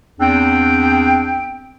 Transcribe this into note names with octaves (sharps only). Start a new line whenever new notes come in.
E2 C4 D4 G5